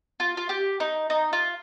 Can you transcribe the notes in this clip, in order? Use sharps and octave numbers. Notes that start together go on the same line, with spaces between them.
F4
F4
G4
D#4
D#4
F4